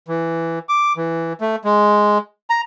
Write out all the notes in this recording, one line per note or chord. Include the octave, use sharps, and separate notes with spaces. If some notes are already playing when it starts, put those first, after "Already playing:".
E3
D6
E3
A3
G#3
A#5